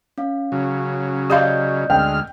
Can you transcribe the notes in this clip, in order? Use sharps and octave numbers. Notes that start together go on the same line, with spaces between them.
C#4 F5
C#3 F#3
G4 D5 D#5 F5 G6
D2 G#3 G5 F6